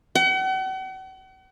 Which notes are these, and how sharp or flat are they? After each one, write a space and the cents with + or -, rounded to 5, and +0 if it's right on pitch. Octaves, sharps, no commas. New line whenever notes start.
F#5 +40